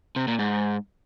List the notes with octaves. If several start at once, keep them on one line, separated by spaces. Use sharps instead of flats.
C3
A#2
G#2